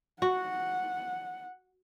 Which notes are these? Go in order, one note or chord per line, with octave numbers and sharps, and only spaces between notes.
F#4 F#5